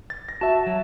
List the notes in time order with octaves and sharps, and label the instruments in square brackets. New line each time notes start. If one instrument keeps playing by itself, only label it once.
[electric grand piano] A6
A#6
[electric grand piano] F#4 E5 [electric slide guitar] A5
[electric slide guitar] F#3